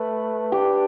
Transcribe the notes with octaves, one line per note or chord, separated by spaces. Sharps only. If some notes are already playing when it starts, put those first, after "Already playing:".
Already playing: A3 B4
D4 G4